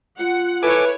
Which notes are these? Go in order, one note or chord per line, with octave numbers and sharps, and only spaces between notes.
F4 F#5
E4 A4 B4 C#5 G#5 D6